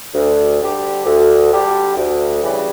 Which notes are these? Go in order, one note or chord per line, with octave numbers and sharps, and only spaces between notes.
D2
D3 G3 D4 G4
D2
D3 G3 D4 G4
D2
C#3 E3 G3